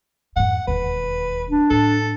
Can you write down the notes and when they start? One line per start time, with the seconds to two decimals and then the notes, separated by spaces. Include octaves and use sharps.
0.36 F2 G#2 F#5
0.68 E1 D#2 B4
1.50 D4
1.71 A2 A3 A4